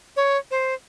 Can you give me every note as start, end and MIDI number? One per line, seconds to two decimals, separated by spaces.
0.17 0.37 73
0.51 0.74 72